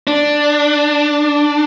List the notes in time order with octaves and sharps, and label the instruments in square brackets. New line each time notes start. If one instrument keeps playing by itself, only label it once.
[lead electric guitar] D4